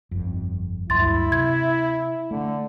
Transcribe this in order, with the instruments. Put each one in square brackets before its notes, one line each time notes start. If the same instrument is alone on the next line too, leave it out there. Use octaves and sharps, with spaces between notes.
[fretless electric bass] G1 F2
[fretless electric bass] D2 G2 F#3 [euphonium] E4 [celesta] C6 A6
[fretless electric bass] C3 [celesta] G#6
[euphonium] D3 [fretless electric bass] A3